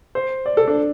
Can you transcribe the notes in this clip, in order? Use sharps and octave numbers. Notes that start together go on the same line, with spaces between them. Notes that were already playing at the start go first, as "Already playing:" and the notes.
C5
D5
A4
D4